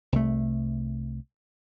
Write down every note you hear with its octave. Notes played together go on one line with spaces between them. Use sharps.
C2 A3